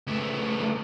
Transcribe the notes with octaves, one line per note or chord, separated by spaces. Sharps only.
C#2 A3